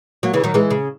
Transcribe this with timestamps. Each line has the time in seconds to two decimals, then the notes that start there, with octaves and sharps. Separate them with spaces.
0.23 F#3 A#3
0.34 C#3 E3
0.44 D#3 F#3
0.54 E3 G#3
0.70 C#3